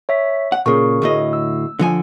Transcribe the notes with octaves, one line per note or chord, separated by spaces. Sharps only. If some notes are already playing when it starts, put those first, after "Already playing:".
C#5 E5 B6
F#5
A#2 C#3 G#4 A#4 C#6
D2 A2 D#5
E6
D3 F3 G#5